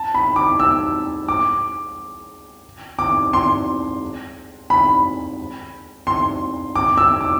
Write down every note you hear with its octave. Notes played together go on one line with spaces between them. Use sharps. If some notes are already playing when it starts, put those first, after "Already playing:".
Already playing: A5
B5
D6
E6
D6
D6
C6
B5
C6
D6
E6
D6